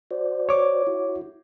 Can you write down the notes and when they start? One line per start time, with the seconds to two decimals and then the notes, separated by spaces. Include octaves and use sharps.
0.11 F#4 C5 D5
0.49 C#5 D6
0.87 E4 F#4